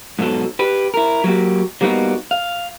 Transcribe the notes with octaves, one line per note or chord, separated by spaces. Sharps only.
G#2 B2 F#3 A4
G4 B4
E4 A#4
F#3 A3 A#3 F#4 G4
F#3 G3 A#3 B3 D#4 F#4
F5